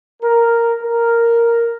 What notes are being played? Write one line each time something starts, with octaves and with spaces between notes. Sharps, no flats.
A#4
A#4